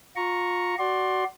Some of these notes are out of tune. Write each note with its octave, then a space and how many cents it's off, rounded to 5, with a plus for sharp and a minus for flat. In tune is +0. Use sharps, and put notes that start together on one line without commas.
F4 +30 A#5 +0 C#6 +0
F#4 +20 D5 +0 C6 +20